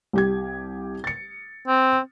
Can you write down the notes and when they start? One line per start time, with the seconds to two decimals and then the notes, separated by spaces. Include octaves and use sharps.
0.13 C2 G4 G#6
1.04 A6 C#7
1.68 C4